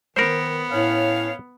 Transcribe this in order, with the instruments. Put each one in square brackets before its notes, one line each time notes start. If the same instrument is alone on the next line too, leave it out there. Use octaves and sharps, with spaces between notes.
[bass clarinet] D#3 [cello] B3 [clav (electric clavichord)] A#4 C5
[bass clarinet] A2 [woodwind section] C#4 C#5 F5